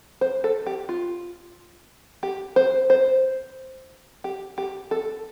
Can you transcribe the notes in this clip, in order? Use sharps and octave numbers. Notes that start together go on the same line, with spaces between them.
C5
A4
G4
F4
G4
C5
C5
G4
G4
A4